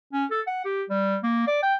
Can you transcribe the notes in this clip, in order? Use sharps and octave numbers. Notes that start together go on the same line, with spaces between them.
C#4
A4
F#5
G4
G3
A#3
D5
G5